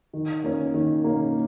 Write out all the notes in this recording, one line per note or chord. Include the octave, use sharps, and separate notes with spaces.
D#3
A#3 C#4
D#3
A#3 C#4